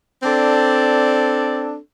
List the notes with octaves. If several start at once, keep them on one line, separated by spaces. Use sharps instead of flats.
C4 D4 A4 D5